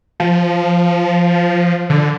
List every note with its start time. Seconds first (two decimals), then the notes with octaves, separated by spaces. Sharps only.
0.20 F3
1.90 D3